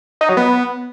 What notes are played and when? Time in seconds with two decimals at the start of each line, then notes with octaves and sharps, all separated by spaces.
0.21 D#4
0.29 F#3
0.37 B3